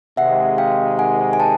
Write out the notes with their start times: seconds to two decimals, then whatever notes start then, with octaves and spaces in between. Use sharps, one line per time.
0.17 C3 D#3 G#3 E5 F#5
0.58 F5 G5
0.99 F#5 G#5
1.33 G#5
1.40 G5 A5